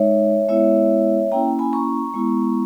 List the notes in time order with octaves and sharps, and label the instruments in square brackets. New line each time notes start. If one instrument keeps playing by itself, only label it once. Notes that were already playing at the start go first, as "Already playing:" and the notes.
Already playing: [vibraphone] G#3 D#4 C#5 E5
G#3 B3 E4 C#5 E5
A#3 C#4 E4 G5 A#5
G#5 B5
A#5 C#6
G#3 B3 E4